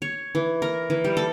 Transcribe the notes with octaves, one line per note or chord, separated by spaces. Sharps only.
C#5
E3
A#4
E3
G3
A4